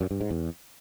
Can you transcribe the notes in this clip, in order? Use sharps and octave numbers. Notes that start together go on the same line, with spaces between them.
F#2
G2
G#2
E2